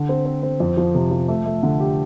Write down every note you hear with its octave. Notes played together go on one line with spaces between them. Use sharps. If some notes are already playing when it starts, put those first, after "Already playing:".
Already playing: D3
C4
C4
C4
F2
F3
C3
F3
A3
A3
D3
G4